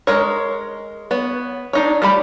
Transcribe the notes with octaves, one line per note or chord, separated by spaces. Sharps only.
G#3 A#4 C#5
B3 C#5
D4 D#4 C#5
G3 A3 G4 B5